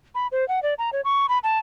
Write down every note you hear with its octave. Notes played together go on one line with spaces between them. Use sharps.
B5
C5
F#5
D5
A#5
C#5
C#6
B5
A5